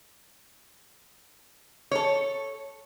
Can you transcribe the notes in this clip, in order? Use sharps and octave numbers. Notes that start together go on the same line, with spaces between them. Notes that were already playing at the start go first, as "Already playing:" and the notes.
A4 C#5